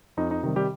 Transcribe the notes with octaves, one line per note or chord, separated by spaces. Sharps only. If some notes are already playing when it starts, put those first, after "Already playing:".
F2 D#4
D#4
C3 D#3 G3 D#4
G3 G4